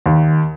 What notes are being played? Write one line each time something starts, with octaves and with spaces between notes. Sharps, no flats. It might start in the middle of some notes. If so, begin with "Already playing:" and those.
D#2